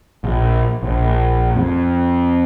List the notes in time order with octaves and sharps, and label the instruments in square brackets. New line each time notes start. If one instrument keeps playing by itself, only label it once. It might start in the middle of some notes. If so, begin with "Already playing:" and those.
[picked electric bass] A#1
A#1
F2